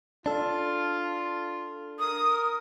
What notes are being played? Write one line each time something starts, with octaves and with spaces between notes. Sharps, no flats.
D4 F4 A4
A#4 D#6